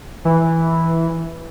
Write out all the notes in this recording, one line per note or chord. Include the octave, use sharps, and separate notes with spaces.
E3